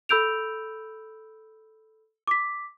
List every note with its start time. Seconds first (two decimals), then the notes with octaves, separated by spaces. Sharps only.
0.09 A4 B5 E6 G6 D7 F7
2.27 D6 B6